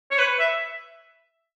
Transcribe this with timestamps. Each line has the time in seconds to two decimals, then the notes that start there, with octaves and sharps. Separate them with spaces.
0.11 C#5
0.18 B4
0.40 E5